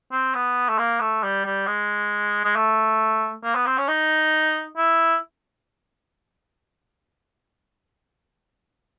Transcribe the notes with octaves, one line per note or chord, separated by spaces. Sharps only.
C4
B3
A3
A#3
A3
G3
G3
G#3
G#3
A3
A#3
B3
C4
C#4
D#4
E4